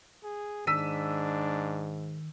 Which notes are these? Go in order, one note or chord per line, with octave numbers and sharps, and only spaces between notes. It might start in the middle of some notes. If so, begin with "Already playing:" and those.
G#4
G#2 D#3 D4 E6 B6 D#7